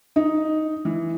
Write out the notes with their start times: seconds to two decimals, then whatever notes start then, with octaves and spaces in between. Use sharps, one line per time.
0.16 D#4
0.85 E3